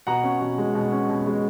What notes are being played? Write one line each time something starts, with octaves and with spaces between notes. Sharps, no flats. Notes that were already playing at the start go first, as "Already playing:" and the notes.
B2 F#5 A#5
C#4
B2
G#3
B2
C#4
B2
G#3